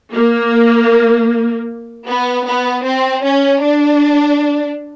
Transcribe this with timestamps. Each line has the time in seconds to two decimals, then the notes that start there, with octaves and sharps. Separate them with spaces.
0.14 A#3
2.07 B3
2.46 B3
2.85 C4
3.23 C#4
3.62 D4